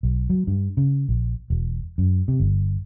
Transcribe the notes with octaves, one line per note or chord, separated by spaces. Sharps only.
B1
F#3
G2
C#3
A#1
E1
F#2
C3
G1